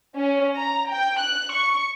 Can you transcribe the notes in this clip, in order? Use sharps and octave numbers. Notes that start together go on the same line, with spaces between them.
C#4
A#5
G5
F#6
C#6